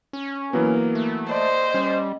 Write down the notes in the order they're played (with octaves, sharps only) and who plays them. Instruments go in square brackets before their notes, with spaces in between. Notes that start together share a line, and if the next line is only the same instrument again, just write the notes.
[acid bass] C#4
[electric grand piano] E3 F#3 B3 [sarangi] A#3
[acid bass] A3
[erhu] C5 [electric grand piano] D5 [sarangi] D#5
[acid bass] G3 [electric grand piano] C#4